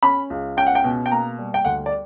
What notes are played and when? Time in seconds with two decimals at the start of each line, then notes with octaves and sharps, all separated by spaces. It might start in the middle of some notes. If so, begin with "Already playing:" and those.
0.03 C#4 B5
0.30 C#2
0.57 C#4 G5
0.67 F#5
0.75 G5
0.84 B2
1.06 G5
1.11 A#3 A#5
1.39 G3
1.54 G5
1.65 D2 F#5
1.86 D5